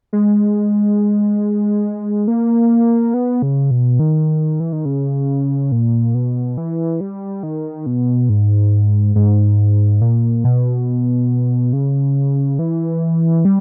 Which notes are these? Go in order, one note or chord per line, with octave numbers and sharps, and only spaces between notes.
G#3
A#3
B3
C#3
B2
D#3
E3
D#3
C#3
A#2
B2
E3
G3
D#3
B2
G#2
G#2
A#2
B2
C#3
E3
G3